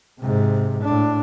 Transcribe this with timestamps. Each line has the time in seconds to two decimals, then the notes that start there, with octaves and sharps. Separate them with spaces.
0.20 G#2 C3
0.83 A2 D4